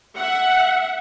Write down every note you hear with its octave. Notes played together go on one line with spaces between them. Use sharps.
E5 F#5